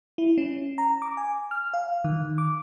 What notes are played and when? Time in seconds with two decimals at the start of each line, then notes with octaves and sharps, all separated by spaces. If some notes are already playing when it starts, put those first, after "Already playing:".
0.18 E4
0.38 C#4
0.78 A#5
1.02 D6
1.17 G#5
1.51 F6
1.74 F5
2.04 D#3
2.38 D6